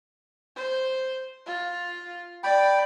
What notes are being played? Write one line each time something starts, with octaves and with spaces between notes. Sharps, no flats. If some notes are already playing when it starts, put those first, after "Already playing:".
C5
F4
D5 G5 B5